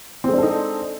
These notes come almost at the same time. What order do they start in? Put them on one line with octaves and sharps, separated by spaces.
C4 G#3 D4 A4 D#4